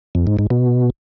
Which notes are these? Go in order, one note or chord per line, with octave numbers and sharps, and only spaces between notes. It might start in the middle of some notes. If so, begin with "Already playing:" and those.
F2
G#2
G#2
B2